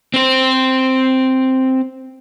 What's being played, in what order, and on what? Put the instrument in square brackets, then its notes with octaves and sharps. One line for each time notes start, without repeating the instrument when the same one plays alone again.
[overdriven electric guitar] C4 C5